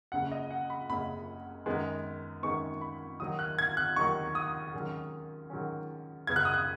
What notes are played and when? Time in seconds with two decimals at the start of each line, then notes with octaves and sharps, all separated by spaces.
0.12 F#1 F#2 C#3 F#5
0.32 D#5
0.51 F#5
0.70 B5
0.89 F#1 F#2 C#3 B5
1.66 F#2 D#3 G#3 B3 D#4
2.43 F#2 D#3 G#3 B3 D#4 C#6
2.81 B5
3.20 D#2 D#3 F#3 D#4 D#6
3.39 F#6
3.59 G#6
3.77 F#6
3.96 D#2 D#3 F#3 D#4 C#6
4.35 D#6
4.73 G#2 D#3 F#3 C#4
5.50 G#2 D#3 F#3 C#4
6.27 F#2 C#3 B3 G#6
6.36 F#6
6.45 D#6
6.54 F#6